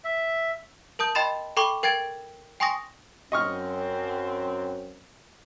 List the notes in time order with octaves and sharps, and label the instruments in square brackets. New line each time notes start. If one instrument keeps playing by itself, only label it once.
[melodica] E5
[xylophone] A#4 A5 D#6 G6
D#5 G5 B5 C6 A6 E7
A4 G5 B5 C#6 D6 G7
A#4 G5 G#6 A6 D7
G5 G#5 C6 C#6 D#6 A#6
[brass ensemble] F#2 C4 [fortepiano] D#5 C#6 F6